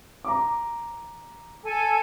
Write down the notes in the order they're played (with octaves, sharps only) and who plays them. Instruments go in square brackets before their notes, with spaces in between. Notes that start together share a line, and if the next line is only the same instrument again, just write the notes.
[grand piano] A#5 D6
[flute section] A4 G#5